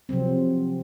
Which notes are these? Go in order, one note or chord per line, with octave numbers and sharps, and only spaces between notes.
C3 F3 F#3 C4